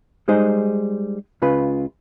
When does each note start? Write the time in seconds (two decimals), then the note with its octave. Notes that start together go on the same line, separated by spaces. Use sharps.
0.28 G3 G#3 D#4 G#4 C5 D#5
1.42 C#2 C#3 F4 B4